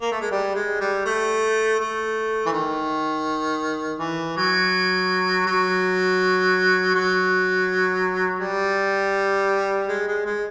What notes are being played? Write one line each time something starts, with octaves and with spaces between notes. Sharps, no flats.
A#3
A3
G#3
G3
G#3
G3
A3
A3
E3
D#3
E3
F#3
F#3
F#3
G3
G#3
G#3
G#3